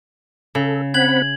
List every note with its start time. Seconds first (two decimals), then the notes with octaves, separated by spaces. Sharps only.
0.55 C#3 A4
0.94 C4 F#5 B5 G#6 F#7